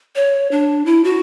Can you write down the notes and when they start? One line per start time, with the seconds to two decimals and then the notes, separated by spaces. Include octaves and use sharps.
0.16 C#5
0.51 D4
0.86 E4
1.04 F#4